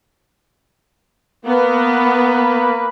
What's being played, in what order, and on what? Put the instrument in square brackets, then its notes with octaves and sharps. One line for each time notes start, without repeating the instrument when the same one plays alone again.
[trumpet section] A#3 B4 [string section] B3